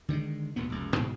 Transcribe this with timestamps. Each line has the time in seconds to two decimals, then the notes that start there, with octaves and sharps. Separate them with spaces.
0.09 D3 D#3 G3 G#3
0.56 E1 D2 A#2 B3
0.70 F1 C#2 F#2
0.95 G#2 B2 D3 G#3